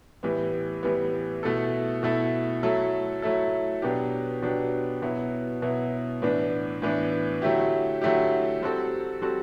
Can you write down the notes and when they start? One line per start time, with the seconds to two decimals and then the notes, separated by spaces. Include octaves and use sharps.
0.23 A2 E3 G3 B3
0.83 A2 E3 G3 B3
1.43 B2 A3 E4 A4
2.03 B2 A3 E4 A4
2.63 F#3 A3 E4 A4
3.22 F#3 A3 E4 A4
3.82 B2 F#3 B3 D4 G4
4.42 B2 F#3 B3 D4 G4
5.02 B2 F#3 B3 E4
5.62 B2 F#3 B3 E4
6.22 A2 E3 B3 D4
6.82 A2 E3 B3 D4
7.42 D3 F#3 A3 E4 G4
8.01 D3 F#3 A3 E4 G4
8.62 G3 C4 F#4 A4
9.22 G3 C4 F#4 A4